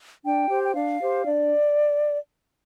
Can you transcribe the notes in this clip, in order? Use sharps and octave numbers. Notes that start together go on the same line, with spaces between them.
D4 G5
G4 C5
G5
D4 F5
G4 C5
D4 D5